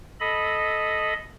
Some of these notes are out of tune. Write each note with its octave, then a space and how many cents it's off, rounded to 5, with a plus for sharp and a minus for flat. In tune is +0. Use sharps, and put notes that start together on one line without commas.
A4 -10 D#5 +0 B5 +0